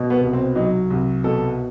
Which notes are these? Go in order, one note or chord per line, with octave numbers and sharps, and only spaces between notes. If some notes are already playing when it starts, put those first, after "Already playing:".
Already playing: B2
B3
C2
C4
F#3 D#4
C2
B2 A4